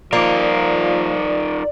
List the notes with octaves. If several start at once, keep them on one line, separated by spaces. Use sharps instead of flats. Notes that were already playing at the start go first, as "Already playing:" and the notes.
F3 A#3 D#4 F4 A#4 D5